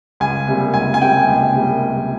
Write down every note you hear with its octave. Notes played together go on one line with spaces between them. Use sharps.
C#2 G#5
C3 G3 A#3
C#2 G#5
G#5
C3 G3 A#3 G5
C#2
C3 G3 A#3
C#2